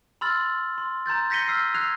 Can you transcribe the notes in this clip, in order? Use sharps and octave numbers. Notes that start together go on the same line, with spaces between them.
B5 C6 E6 F6 A6 F#7
C6
A#5 C6 G6 A6
G6 A#6 B6 C#7 D#7 G7
E6 F6 C7
E6 F#6 G#6 C7 F7